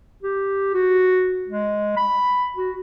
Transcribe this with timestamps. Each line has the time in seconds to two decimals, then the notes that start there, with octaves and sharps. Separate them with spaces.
0.23 G4
0.74 F#4
1.48 G#3
1.97 B5
2.57 F#4